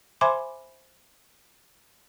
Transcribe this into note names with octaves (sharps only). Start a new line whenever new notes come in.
C5 E5 G#5 B5 C6 D6